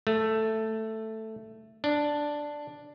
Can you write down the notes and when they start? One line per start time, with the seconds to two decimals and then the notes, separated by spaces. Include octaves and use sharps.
0.07 A3
1.84 D4